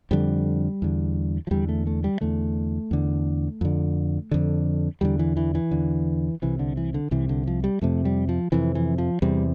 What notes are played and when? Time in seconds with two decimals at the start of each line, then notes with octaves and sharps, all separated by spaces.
0.11 F2 D3 G3
0.82 E2 D3
1.47 F3
1.51 E2 D3 G3
1.69 A3
1.87 A3
2.04 G3
2.21 E2 D3 A3
2.91 E2 D3
3.61 F2 D3
4.31 F2 D3
5.01 E2 D3 G3
5.19 E3
5.37 E3
5.55 E3
5.71 E2 D3
6.42 C2 C3 E3
6.59 D3
6.77 E3
6.94 D3
7.11 C2 C3 E3
7.29 D3
7.47 F3
7.64 G3
7.82 F2 C3 A3
8.05 G3
8.29 F3
8.52 F2 C3 E3
8.75 E3
8.98 F3
9.22 E2 C3 G3